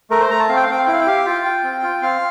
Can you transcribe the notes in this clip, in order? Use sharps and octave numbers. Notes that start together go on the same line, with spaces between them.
A3 A#4
C5
A3 A#5
A5
C4 F5
G5
F5
C4 G5
F5
E4 G5
F5
G5
G4 F5
F4 G5
F4
C4
F4
C4 F5